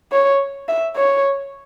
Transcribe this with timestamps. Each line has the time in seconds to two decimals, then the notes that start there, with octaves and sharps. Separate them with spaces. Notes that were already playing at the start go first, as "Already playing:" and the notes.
0.12 C#5
0.68 E5
0.96 C#5